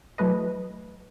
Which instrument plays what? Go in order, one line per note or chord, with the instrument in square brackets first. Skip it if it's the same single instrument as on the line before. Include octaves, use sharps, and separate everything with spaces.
[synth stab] E3 F#3 A3 B4 D#5